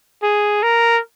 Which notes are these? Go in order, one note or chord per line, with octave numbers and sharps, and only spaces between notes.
G#4
A#4